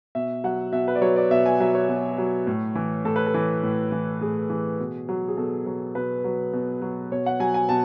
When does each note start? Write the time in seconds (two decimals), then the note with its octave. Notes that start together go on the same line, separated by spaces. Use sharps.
0.15 B2 E5
0.44 F#3 F#5
0.72 B2 E5
0.88 B4
0.95 D5
1.02 F#3 C#5
1.16 D5
1.31 B2 E5
1.46 G#5
1.60 F#3 E5
1.75 C#5
1.89 B2
2.18 F#3
2.47 A2
2.75 E3
3.05 A2 A4
3.16 B4
3.26 A4
3.34 E3
3.63 A2
3.92 E3
4.21 A2 G#4
4.50 E3
4.79 B2
5.09 F#3
5.28 G#4
5.37 B2 A4
5.66 F#3
5.95 B2 B4
6.24 F#3
6.53 B2
6.82 F#3
7.12 B2 C#5
7.26 F#5
7.40 F#3 G#5
7.54 G#5
7.69 B2 A5